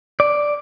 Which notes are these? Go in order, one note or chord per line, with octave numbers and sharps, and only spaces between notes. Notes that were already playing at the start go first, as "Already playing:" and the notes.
D5